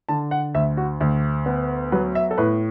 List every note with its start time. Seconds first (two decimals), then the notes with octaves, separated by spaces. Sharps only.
0.09 D3 A5
0.31 F#5
0.54 D2 E5
0.77 F#4
1.01 D2
1.46 B3
1.92 F#3 B4
2.15 E5
2.31 A4
2.38 A2 B4